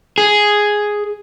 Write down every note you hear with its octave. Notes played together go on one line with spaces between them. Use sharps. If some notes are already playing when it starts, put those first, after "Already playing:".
G#4